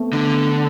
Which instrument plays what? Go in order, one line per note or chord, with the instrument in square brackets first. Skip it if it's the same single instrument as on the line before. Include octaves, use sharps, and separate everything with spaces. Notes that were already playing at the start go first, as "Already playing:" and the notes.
Already playing: [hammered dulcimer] B2 A3 C4
[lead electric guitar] D3